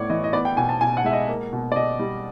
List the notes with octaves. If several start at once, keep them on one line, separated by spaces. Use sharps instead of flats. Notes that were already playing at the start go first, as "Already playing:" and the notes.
Already playing: A2 B3 C#5 D5
E3 D#5
D#5
B3 D5
G5
B2 G#5
A5
B2 G#5
F#5
G#3 E5
D#5
A#3
B2
D5
B2 D#5
G3